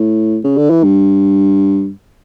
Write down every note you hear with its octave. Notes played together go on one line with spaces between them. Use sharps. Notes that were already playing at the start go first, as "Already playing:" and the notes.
Already playing: A2
C#3
D3
E3
G2